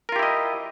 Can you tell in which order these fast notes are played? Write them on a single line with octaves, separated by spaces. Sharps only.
A#4 F4 G4 E4 D#5